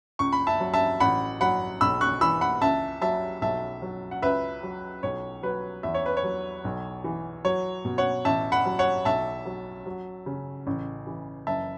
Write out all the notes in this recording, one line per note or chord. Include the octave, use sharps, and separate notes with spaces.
C#2 C#6
B5
E5 A5
F#3
E5 A5
A1 F#5 B5
F#3 F#5 B5
B1 B5 E6
C#6 F#6
E3 B5 E6
F#5 B5
C#2 E5 A5
F#3 E5 A5
B1 E5 A5
F#3
F#5
C#2 B4 E5
F#3
B1 C#5
F#3 B4
E2 E5
C#5
B4
C#5
F#3
B1
E3
F#3 C#5
B2
C#5 F#5
A1 E5 A5
F#5 B5
F#3
C#5 F#5
B1 E5 A5
F#3
F#3
C#3
A1
E3
F#1 E5 A5